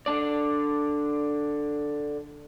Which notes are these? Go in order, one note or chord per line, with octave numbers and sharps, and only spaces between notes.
D3 D4 D5